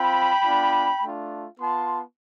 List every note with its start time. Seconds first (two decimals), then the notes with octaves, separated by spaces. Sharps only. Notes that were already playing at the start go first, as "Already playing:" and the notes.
Already playing: C4 F4 G5 B5
0.45 B3 D4 F4
1.02 A3 D4 F4
1.59 B3 F4 A5 C6